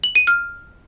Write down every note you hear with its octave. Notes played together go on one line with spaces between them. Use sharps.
F#7
D#7
F6